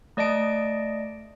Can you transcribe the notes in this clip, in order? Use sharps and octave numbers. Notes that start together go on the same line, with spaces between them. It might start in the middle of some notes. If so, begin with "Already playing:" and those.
A3 D5 D#5 A5 D7